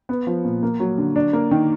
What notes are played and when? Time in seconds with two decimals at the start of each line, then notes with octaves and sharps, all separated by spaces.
0.09 B3
0.27 F3
0.45 A#2
0.63 A#3
0.80 F#3
0.98 D3
1.16 D4
1.33 A#3
1.51 D#3